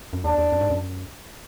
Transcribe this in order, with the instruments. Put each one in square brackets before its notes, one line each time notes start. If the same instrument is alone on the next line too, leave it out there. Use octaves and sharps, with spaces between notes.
[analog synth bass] F#2
[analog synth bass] E2 [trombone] D4
[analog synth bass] E2
F#2
G#2
F#2